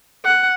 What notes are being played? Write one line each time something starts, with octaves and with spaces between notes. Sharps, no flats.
F#5